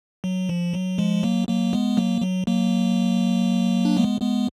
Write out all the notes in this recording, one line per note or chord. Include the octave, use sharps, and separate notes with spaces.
F#3
F3
F#3
F3 G#3
F#3 A#3
F#3 A#3
G#3 B3
F#3 A#3
F#3
F#3 A#3
D4
G#3 B3
G#3 B3